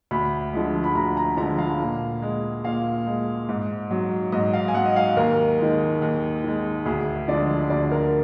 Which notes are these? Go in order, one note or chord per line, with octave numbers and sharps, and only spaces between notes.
D2 B5
D3 F3 G#3
B5
D2 A#5
A#5
D3 F3 G#3 A#5
F5
A#2
G#3
A#2 F5
G#3
G#2
F#3
G#2 D#5
F5
G#5
F#3 F#5
D#5
F5
D#2 A#4
D#3 G#3
D#2
D#3 G#3
D2 G#4
D3 F3 G#3 D5
D2 D5
A#4